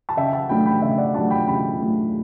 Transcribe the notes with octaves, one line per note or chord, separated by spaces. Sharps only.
A5
C#3 E5 G5
F#5 A5
F#3 A3 D4 G5 B5
G5 B5
C#3 E5 G5
D5 F#5
F#3 A3 D4 F#5 A5
G5 B5
C#3 G5 B5
F#3 A3 D4